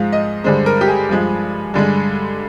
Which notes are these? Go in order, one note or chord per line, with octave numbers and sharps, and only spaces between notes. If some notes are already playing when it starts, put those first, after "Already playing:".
Already playing: G#2 F3 G#3 F5
D#5
G2 D3 G#3 C5
A#4
G4
G#4
G2 F3 G#3
G2 D3 G#3